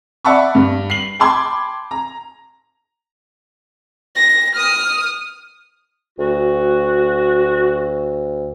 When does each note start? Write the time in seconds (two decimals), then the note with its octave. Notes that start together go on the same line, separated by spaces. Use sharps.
0.25 D5 E5 F#5 A5 B5 C#6
0.55 G2
0.90 C7 F#7
1.19 G5 A5 B5 C6 D6 G#6
1.91 A#5
4.16 A#6
4.56 D#6 F6
6.19 D2 F#4